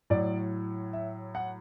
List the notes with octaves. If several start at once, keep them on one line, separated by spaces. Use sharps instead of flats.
A2 F#3 D5
E5
F#5